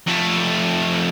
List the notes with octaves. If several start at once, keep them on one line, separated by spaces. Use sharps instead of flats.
F2 A3